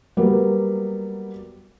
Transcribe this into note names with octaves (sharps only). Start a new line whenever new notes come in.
F#3 G3 A#3 B3